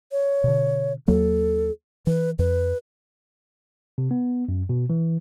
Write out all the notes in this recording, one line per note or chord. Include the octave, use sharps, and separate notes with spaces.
C#5
B2 D3
D#2 F#3 A#3 A4
E3 B4
F2 B4
C3
B3
F#2
B2
E3